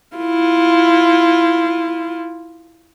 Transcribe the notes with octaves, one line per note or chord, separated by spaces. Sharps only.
E4 F4